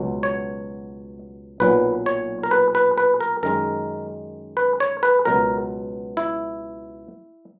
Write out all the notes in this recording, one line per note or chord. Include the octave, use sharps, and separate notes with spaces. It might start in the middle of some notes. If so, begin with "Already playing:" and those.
Already playing: C#2 B2 F#3
C#5
B1 A#2 F#3 B4
C#5
A#4
B4
B4
B4
A#4
F#2 D#3 G#3 A#4
B4
C#5
B4
C#2 B2 F#3 A#4
E4